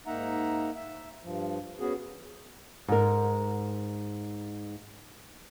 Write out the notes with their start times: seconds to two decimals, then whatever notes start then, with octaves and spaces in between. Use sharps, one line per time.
0.06 G#2 A#3 D#4 E5 F#5 A#5
0.75 E5
1.23 G2 F3
1.80 B3 C#4 F#4 G#4
2.88 G#2 A#4